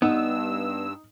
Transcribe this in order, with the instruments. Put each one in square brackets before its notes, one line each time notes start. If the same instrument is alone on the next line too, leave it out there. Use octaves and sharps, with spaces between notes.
[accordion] G2 E6 [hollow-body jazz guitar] B3 [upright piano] D#4